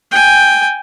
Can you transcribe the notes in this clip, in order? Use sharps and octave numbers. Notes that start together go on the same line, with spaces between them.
G5 G#5